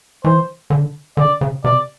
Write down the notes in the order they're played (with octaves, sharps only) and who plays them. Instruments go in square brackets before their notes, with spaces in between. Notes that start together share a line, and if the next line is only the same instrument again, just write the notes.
[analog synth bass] E3 [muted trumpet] C5
[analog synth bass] D3
[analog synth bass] D3 [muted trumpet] D5
[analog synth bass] C#3
[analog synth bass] C3 [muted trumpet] D5